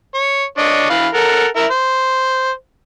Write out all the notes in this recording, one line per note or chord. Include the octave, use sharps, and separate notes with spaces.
C#5
D4 C#5 D#5
E3 F5 B5
A4 A#4 F#5
E4 A#4 E5
C5